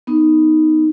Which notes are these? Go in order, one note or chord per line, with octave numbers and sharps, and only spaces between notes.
B3 D#4